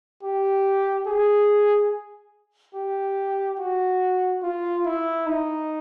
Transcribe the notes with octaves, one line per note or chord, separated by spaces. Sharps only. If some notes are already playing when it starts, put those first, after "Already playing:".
G4
G#4
G4
F#4
F4
E4
D#4